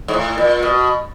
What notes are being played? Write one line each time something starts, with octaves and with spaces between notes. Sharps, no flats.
G#2
A2
A#2
B2